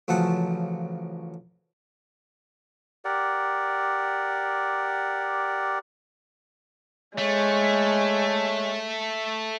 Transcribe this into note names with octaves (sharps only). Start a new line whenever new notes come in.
A1 C#3 F3 F#3 F#5 A5
G4 A#4 D5 F#5
G#3 A3 C#5